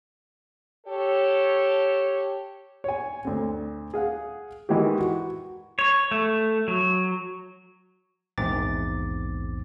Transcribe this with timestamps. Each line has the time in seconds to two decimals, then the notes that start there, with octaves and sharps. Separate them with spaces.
0.87 G4 A4 C#5
2.84 C#5 G#5
3.25 D2 C4
3.94 G#4 F5 F#5
4.69 D#3 E3 G#3 F#4 G4
4.99 F#4
5.79 C#5
6.11 A3
6.68 F#3
8.38 A#1 E2 G#2 C4 D6 A6